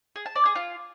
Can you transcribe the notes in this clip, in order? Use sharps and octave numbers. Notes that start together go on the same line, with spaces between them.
G#4
A5
D5
G#4
F4